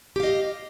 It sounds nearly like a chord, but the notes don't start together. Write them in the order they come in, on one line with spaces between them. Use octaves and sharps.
G4 F5 D#5